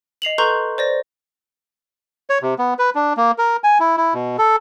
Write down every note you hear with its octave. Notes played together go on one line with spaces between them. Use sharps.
D#5 C7 F7 F#7
A4 B4 A#5 C6 C#6 G6
C5 D5 A#6
C#5
C3
B3
B4
D4
A#3
A#4
G#5
E4
E4
B2
A4